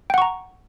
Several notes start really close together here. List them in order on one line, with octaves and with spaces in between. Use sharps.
G5 F#5 C#6 A#5